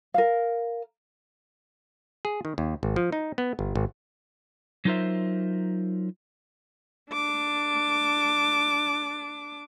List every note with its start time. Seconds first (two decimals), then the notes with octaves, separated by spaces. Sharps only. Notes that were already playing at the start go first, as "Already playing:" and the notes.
0.14 A#4 F5
2.25 G#4
2.45 D#3
2.58 D#2
2.83 G#1
2.96 F3
3.12 D#4
3.38 B3
3.59 G1
3.75 G#1
4.85 F#3 D#4 F4 A#4 C5 E5
7.12 D4 D6